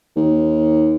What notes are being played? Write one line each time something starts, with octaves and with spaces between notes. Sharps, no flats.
D#2